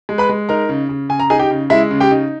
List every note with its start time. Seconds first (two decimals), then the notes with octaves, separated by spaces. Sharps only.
0.09 G#3
0.18 B4 B5
0.29 G#3
0.49 D#4 A#4 A#5
0.69 C#3
0.89 C#3
1.09 C#3 G#5
1.19 A#5
1.30 D#4 G#4 G#5
1.39 G4 G5
1.51 C#3
1.70 G#3 E4 E5
1.91 C#3
2.00 G4 G5
2.11 D#4